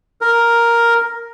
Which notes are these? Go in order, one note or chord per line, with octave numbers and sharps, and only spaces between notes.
A#4